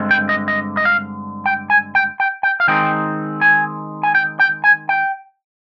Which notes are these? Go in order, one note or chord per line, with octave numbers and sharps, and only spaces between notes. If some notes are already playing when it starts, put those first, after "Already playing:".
Already playing: G2 D3 G#3 C4
G5
D#5
D#5
D#5
F5
G5
G#5
G5
G5
G5
F5
D#3 G#3 C4 D#4 G5
G#5
G#5
G5
G5
G#5
G5